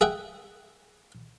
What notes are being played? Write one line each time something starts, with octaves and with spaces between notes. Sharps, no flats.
G#4 E5 F#5 G5